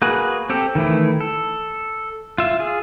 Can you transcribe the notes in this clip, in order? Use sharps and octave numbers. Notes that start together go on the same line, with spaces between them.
A#3 F#4 G#4 B4
C4 G4 A4
D#3 E3 A3 E4
A4
F4 E5
F4 G#4